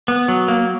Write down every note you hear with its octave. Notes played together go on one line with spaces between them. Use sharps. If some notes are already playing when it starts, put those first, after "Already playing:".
B3
F#3
A#3